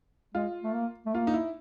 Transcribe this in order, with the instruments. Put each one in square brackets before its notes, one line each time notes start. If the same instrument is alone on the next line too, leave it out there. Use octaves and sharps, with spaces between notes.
[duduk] G#3 [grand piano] F4
[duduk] A3
A#3
A3
[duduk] A#3 [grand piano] F4
[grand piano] D#4
E4